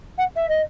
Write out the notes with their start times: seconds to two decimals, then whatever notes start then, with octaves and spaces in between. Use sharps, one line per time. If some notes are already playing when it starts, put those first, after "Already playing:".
0.18 F#5
0.36 E5
0.48 D#5